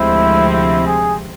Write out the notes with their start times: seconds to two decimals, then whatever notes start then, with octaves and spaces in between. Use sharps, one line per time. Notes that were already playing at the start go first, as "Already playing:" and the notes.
Already playing: D2 C3 F3 G#3 C4 E4
0.53 E4
0.86 G#4